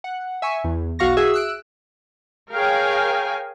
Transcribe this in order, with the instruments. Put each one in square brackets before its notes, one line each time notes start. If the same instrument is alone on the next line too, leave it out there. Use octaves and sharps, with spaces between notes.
[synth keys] F#5
E5 G#5 C#6
E2
B1 F#4 F5 C#6 A#6
F#4 G#4 E5
E6 F#6 D7
[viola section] G#4 A#4 C#5 F5 G5 G#5